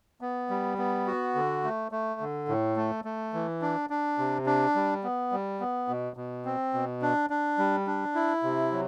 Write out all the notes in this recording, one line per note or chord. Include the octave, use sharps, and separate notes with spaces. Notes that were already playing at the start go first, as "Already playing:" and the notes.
B3
G3
B3
F#4
D3
A3
A3
D3
A2
A3
A3
E3
D4
D4
C3
D4
G3
B3
G3
B3
B2
B2
C4
B2
D4
D4
G3
D4
E4
C3
F#3